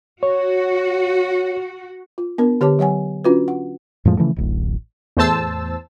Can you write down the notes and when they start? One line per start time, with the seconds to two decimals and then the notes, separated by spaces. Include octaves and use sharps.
0.23 F#4 C#5
2.18 F4
2.38 B3 D4 A#4
2.61 D3 G4 C#5 A5 D6
2.79 F#3 C#5 F#5 G#5
3.24 C#4 D4 F4 F#4 B4
3.48 F#5
4.05 F2 A2 F3 G#3
4.17 C#3 E3 F3 A3
4.36 D1 A1
5.17 E2 A2 C5 A5 E6